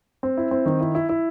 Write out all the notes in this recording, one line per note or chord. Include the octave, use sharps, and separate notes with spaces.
C4
E4
C4
D#3
E4
E4
E4